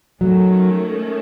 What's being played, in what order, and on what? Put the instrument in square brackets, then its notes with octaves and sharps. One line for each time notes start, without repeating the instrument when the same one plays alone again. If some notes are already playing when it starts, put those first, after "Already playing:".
[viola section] D#3 A3 C#4 [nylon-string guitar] F#3